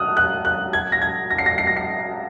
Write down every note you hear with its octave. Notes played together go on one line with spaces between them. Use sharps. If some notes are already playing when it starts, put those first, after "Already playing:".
Already playing: D#6 F6 F#6
F#6
F#6
G#6
A#6
G#6
A#6
C7
A#6
C7
A#6
C7